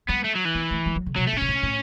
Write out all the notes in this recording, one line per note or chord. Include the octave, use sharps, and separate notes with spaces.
G3 B3
A3
F#3
E3
B3
A3
G3
F#3
C#3
B2 F#3
A3
A2
B2 C#4
A2
A2